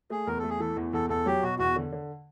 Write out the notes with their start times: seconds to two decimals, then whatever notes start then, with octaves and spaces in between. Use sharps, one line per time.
0.10 A3 G#4
0.27 E2 A#4
0.39 A3 A4
0.50 G#4
0.60 E3 A4
0.77 E2
0.93 E2 A4
1.09 E2 A4
1.26 F#3 G4
1.42 B2 F#4
1.59 E2 F#4
1.76 D3
1.92 D3